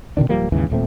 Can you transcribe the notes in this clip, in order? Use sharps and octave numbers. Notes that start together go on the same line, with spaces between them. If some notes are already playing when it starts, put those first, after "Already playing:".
B2 D3 D#3 D4
D1 F3 G3 A#3
D#2 G#2 C#3 E3
D#1 A#2 A3 C4